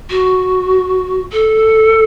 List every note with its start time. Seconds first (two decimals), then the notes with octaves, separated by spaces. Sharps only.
0.10 F#4
1.32 A4